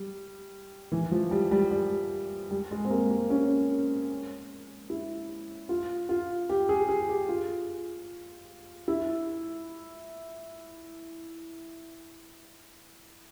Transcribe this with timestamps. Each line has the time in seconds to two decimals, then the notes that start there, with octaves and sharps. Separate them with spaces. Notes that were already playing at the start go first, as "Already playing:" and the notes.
Already playing: G3
0.92 E3
1.11 F3
1.31 G3
1.51 G3
1.71 G3
2.51 G3
2.71 G#3
2.85 C4
2.90 A#3
3.11 A#3
3.30 C#4
4.90 E4
5.69 F4
6.09 F4
6.49 G4
6.69 G#4
6.89 G#4
7.09 G4
7.29 F4
8.88 E4